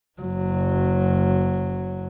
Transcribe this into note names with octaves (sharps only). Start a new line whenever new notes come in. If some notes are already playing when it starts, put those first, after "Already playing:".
F#1 F#3